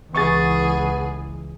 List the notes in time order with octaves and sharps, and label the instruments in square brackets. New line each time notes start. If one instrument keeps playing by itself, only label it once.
[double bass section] C#2 E3 [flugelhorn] B3 [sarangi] G#4 [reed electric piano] C#6 A6